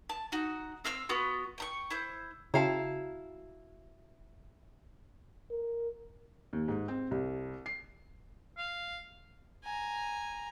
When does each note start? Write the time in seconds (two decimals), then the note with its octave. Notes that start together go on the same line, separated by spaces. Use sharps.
0.09 A5
0.32 D#4 F#4
0.84 C4 F5 E6 F6
1.09 B3 F4 F#4 C6
1.58 G5 A#5 C#6
1.90 E4 C5
2.54 C#3 E4 F#4 F5 G5 A5 A#5
5.51 A#4
6.53 D#2
6.68 G#2
6.88 C4
7.11 C2
7.66 C7
8.57 F5
9.64 G#5 A#5